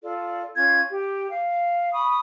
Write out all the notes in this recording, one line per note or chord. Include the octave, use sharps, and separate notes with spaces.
F4 A4 D5
C#4 F4 G#6
G4
F5
B5 C#6 D#6